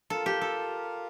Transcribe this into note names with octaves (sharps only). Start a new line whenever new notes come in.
F4 A4 A#4 F5
G4
A4